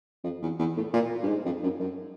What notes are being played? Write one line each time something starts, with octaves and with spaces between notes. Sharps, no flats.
F2
E2
E2
A2
A#2
G2
G#2
F2
F#2
F#2